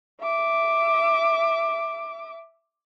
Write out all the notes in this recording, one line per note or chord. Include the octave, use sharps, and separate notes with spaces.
E5 D6